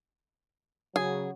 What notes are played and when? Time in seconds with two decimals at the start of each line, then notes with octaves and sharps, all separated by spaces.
0.96 C#3 F#3 G#4